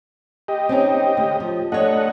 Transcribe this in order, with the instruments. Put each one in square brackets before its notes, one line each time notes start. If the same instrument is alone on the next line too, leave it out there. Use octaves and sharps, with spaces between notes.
[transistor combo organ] G4 D#5
[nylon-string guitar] C4 C#4 D#4
D2
F3
[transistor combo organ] A3 D#5 F#5 [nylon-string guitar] D4 C#5